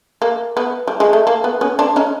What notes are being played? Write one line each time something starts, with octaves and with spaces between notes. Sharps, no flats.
A#3
B3
G3
G#3
A3
A#3
B3
B3 C#4
C4 D4
C#4 D#4